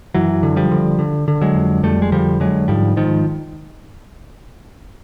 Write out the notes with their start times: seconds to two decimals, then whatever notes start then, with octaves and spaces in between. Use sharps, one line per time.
0.15 F#2 E3 F#3
0.43 D3
0.56 F3 G3
0.71 D3
0.99 D3
1.28 D3
1.42 F#3 G#3
1.55 F2
1.83 F2 G3 A3
2.02 G#3
2.12 D3 F3 G3
2.40 D3 F#3 G#3
2.68 G#2 F3 G3
2.97 G#2 D#3 F3